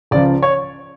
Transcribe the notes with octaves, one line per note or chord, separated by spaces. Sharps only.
C#2 C#3 F3 D5
C#5